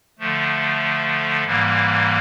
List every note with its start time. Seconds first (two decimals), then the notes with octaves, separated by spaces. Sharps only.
0.19 D3 F3 A3
1.44 G#2 E3 G3 A#3